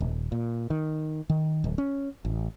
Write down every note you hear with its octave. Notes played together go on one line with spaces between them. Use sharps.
D#1
A#2
D#3
D#3
D1
C#4
A1